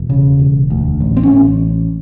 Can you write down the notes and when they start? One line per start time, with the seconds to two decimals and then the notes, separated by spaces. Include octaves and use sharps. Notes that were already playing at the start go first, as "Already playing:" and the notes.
Already playing: E1
0.10 C#3
0.39 E1
0.70 D2
1.00 A1
1.17 C4
1.23 C#4
1.30 A1